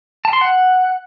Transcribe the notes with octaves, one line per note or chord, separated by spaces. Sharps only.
A5
C6
F#5